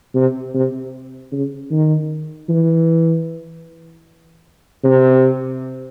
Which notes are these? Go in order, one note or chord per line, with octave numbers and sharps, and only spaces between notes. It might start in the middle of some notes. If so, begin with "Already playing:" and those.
C3
C3
C#3
D#3
E3
C3